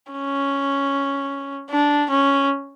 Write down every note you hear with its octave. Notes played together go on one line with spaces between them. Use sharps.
C#4
D4
C#4